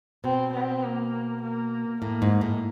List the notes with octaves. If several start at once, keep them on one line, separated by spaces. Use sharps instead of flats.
B2 C4
C4
A#3
A#3
A2 A#3
G#2
A2